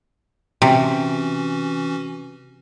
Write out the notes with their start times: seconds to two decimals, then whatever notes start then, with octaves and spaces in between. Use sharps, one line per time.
0.62 C3 E3 C#4 F#4